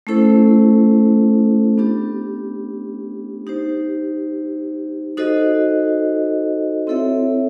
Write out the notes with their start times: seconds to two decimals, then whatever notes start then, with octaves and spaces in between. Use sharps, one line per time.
0.07 A3 C#4 E4 A4 C5
1.78 B3 D4 G4
3.47 D#4 G4 C5
5.17 D#4 F#4 A4 C5 D#5
6.87 C4 E4 A4 C#5 E5